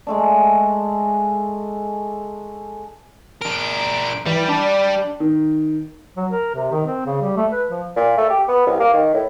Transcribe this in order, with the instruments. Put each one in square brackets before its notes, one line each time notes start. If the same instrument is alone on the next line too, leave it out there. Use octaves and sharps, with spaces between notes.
[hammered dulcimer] G#3 A3 D4
[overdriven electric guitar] D4 A#4 [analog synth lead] D7
[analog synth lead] E3 [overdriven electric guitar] G3
[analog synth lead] D4
[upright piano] D#3
[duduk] F#3
A#4
C3
D#3
C4
C#3
G3
A3
B4
F3
[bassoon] A#2
A3
G4
B3
C2
A#3
D#3
A2